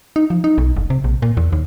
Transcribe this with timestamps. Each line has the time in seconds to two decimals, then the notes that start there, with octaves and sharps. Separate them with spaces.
0.16 D#4
0.30 F3
0.44 D#4
0.58 B1
0.76 F#1
0.90 C3
1.04 A#1
1.22 A#2
1.37 E2
1.52 D#2